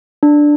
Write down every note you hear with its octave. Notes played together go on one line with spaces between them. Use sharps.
D4